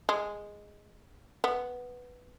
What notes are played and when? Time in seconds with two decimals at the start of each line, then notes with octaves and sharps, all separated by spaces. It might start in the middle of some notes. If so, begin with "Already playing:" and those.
0.09 G#3
1.44 B3